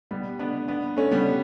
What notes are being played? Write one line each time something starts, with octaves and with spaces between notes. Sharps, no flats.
G3 B3
B3 D4
B3 D4
A3 C#4
G3 B3